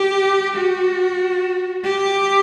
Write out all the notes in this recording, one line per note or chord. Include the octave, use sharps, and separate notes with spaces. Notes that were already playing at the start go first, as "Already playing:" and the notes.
Already playing: G4
F#4
G4